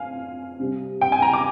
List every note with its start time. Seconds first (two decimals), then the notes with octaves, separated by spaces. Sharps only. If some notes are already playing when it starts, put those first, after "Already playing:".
Already playing: F2 F5 G#5
0.59 C3 G3
1.01 G5
1.12 G#5
1.22 A#5
1.33 D6